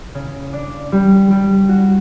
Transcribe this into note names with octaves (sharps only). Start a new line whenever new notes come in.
C#3
D4
G3
G3
F#4